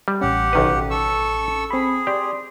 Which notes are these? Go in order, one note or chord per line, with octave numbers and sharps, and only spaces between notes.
G3
A1 C#4 G4 F#5
B1 D#3 B4
A4 C#6 E6
C4 G#4 B5
G4 D5 C6